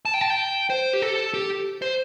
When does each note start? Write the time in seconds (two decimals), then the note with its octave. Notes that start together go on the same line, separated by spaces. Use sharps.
0.05 A5
0.14 G5
0.21 A5
0.30 G5
0.70 C5
0.93 G4
1.02 A4
1.34 G4
1.82 C5